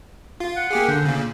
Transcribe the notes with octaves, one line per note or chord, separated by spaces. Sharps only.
F4
F#5
A#3 G4 G#4
D3 C5
A#2 C#3